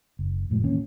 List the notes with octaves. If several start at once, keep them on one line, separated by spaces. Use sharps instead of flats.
F#1
F#1 A2 F3 G#3
D#3 E3 A#3 C#4